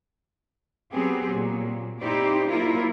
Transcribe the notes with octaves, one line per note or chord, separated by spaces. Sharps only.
F#3 B3 C4 G4 G#4
A#2 F#3
C4 D#4 E4 G4 C5 D5
F#3 A#3 E4 F4 A#4